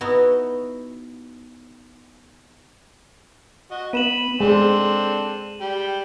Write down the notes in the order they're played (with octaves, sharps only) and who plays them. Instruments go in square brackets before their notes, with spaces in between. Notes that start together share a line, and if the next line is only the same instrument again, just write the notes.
[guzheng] B3 D#4 E4 F#4
[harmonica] F#4 D#5
[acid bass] B3 [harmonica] B5 [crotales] D#7 E7 F#7
[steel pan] G#3 [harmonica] C4 D4 A4 [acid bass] G#4
[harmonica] G3 G5